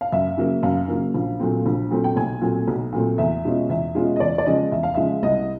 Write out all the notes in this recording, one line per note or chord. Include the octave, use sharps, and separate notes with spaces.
F5
F#2 E5
C#3 F#3 A#3
F#2 F5
C#3 F#3 A#3
A#1
A#2 F#3 A3 C4
A#1
A#2 F#3 A3 C4
G5
B1 G#5
A#2 F#3 A3 C4
B1
A#2 F#3 A3 C4
E2 E5
B2 G#3 C#4 F4
E2 E5
B2 G#3 C#4 F4
D#5
E2 D5
D5
C#3 F3 G#3 D#5
E2 E5
F5
C#3 F3 G#3 E5
C2 D#5